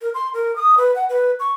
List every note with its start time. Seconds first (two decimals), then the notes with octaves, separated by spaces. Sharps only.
0.02 A#4
0.14 C6
0.34 A#4
0.56 D#6
0.78 B4
0.95 F#5
1.09 B4
1.40 C#6